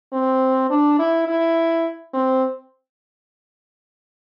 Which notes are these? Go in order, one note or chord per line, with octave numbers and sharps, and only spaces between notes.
C4
D4
E4
E4
C4